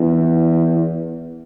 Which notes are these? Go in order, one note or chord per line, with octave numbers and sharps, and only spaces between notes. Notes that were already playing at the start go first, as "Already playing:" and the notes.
Already playing: E2